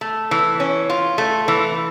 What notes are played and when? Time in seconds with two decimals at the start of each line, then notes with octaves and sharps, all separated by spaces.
0.01 A3
0.31 E3
0.60 C#4
0.90 F4
1.18 A3
1.48 E3